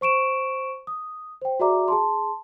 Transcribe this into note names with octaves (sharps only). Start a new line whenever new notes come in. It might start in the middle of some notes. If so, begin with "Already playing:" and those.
C5 C#6 D7 E7
D#6
C5 G5
F#4 G#4 D5 E5 A#5 D6
G#4 A5 C6